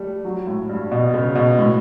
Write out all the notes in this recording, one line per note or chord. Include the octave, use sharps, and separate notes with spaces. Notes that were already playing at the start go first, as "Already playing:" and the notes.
Already playing: G3 A3
F#3
A2
G2
B2
C#3
B2
A2